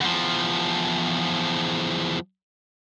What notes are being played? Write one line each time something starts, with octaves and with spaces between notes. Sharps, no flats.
E2 F3